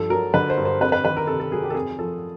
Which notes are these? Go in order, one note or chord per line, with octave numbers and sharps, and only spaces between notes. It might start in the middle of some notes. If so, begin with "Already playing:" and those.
Already playing: G2 F3 A4
F#3 A#4
D3 B4
C5
G2
C5
F2 B4
B4
D#3 B4
A#4
C3 A4
A4
F#3 G#4
G4
A4
F2 G#4
F3 A4